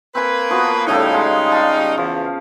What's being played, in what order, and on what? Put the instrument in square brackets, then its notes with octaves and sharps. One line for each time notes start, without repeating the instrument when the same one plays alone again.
[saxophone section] A#3 B4 [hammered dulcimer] C4 G#5
[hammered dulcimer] F3 B3 F#4
[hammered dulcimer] A2 C#3 A4 [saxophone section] G3 D#4
[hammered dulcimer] G#3 F5 G#5
F5 A5
[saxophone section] E2 [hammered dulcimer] F3